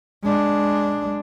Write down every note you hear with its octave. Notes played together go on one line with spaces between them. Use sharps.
G#3 D4